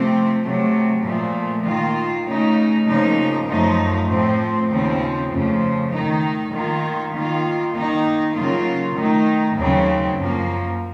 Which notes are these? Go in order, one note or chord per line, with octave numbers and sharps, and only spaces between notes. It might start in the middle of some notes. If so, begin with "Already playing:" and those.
Already playing: C3 F3 A3 C4
C3 F#3 A3
A#2 F3 A3
D#3 A#3 F4
C#3 A3 D#4
C#3 F3 A#3 D#4
F#2 F3 A3 D#4
A2 F3 C4
D#2 C#3 F3 C4
F2 C#3 F3 A3
D#3 A3 D#4
D#3 A#3 F4
D#3 A#3 F4
D#3 A#3 D#4
C#3 F#3 A#3 F4
D#3 A3 D#4
D#2 C#3 F#3 C4
F#2 F3 A#3